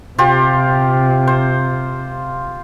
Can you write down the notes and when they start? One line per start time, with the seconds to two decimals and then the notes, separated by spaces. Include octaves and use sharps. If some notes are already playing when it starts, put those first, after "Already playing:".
0.18 C3 F4 G4 C5
1.27 C5